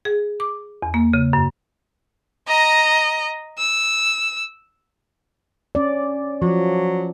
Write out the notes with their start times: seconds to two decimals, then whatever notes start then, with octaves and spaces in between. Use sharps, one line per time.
0.05 G#4
0.40 D6
0.82 E2
0.94 A#3
1.13 C#3
1.33 F#2
2.48 D#5 A#5
3.58 E6
5.75 C#4 D5
6.42 F3 F#3